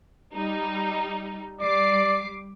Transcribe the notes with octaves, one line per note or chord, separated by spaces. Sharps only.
G3 D#4
G3 D5 D6 C7